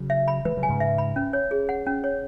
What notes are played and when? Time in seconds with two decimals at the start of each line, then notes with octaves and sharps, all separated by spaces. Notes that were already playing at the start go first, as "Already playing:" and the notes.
Already playing: C#3 F#3
0.10 E5
0.28 B5
0.45 E3 G#3 B4
0.57 C#3 F#3
0.63 G#5
0.69 G#2 C#3
0.80 E5
0.98 B5
1.16 C#4
1.33 C#5
1.51 G#4
1.69 F#5
1.86 C#4
2.04 C#5